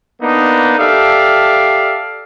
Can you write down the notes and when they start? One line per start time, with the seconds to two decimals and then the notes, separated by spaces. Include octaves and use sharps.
0.21 A#3 B3 D4 D#4
0.78 G4 A4 D5 E5 F5